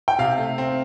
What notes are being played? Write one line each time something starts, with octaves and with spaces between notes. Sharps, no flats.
G5
C3 F5
A3
C4